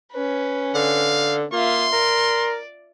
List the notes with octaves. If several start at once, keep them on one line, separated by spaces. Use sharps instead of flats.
C#4 B4
D3 F5
A#3 F4 E5 C6
A#4 D5